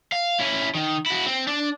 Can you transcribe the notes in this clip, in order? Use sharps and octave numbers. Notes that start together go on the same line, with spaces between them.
F5
C#4 E4
D#3
E4 F#4
C4
D4